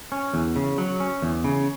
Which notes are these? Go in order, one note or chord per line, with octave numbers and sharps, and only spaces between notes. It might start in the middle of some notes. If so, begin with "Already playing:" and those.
C#4
E2
C#3
F#3
C#4
E2
C#3